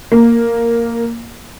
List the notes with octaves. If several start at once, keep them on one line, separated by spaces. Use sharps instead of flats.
A#3